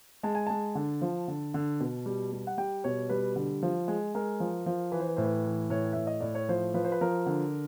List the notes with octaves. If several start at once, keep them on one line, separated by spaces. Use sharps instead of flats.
G#3 A5
G#5
G#3 A5
D3
F3
D3
D3
B2
G3
G3
F#5
G3 G5
B2 C#5
G3 B4
D3
F3
G#3
G#3 A#4
F3
F3
E3 B4
C5
B4
A2 C5
B4
E3
A2 C#5
A2 E5
D#5
A2 D5
C#5
F3 C5
F3 B4
C5
B4
F3 A#4
D3